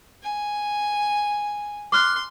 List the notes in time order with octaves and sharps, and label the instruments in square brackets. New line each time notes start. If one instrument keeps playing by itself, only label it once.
[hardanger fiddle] G#5
[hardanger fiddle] C6 [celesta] D6 F6 F#6